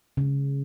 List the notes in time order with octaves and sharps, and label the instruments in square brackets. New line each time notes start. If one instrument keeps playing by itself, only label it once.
[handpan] C#3